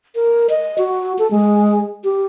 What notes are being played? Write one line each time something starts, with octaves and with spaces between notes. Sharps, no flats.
A#4
D#5
F#4
A4
G#3
G4